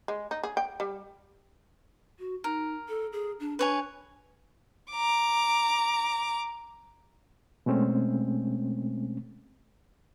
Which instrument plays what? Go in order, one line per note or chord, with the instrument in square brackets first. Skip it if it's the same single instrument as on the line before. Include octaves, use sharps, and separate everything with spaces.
[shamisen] G#3
D#4
G#4
G5
G3
[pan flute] F#4
[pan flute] D#4 [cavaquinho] A#4
[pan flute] A4
G#4
D4
[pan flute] D4 [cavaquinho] B4 C#5 G#5
[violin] A#5 D6
[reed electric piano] B2 G#3 A3 C4 C#4